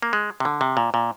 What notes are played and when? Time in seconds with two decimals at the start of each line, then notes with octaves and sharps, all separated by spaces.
0.02 A#3
0.13 G#3
0.40 C3
0.45 D3
0.61 C3
0.77 A#2
0.94 A#2